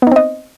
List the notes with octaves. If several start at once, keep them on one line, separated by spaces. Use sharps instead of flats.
B3 C4 D#4 D#5